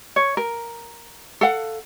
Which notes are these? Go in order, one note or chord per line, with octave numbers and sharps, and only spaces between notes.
C#5
A#4
A4 F5 F#5